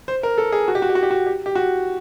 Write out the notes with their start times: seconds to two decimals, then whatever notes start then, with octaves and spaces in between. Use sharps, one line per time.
0.08 C5
0.23 A#4
0.38 A4
0.52 G#4
0.68 F#4
0.75 G4
0.82 F#4
0.89 G4
0.95 F#4
1.03 G4
1.11 F#4
1.26 G4
1.46 G4
1.55 F#4